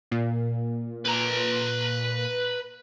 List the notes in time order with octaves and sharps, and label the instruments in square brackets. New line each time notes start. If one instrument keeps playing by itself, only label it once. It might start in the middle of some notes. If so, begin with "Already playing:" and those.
[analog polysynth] A#2
[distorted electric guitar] B4 A#5